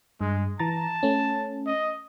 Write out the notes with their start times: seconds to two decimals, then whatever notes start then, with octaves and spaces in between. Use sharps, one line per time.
0.21 G2 G#3
0.59 E3 A5 A#5 A6
1.03 A3 C#4
1.66 D#5